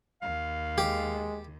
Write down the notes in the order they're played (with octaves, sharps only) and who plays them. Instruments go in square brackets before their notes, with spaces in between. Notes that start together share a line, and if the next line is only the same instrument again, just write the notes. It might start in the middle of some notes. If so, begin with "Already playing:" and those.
[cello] D#2 [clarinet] F5
[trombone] G#3 [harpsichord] G4